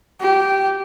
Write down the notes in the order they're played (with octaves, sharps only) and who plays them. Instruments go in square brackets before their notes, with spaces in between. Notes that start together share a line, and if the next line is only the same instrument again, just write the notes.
[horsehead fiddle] G4